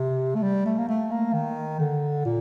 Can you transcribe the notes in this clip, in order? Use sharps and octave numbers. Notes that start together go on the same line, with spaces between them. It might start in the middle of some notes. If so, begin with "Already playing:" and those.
Already playing: C3
A3
G3
A3
A#3
A3
A#3
D#3
D3
A#2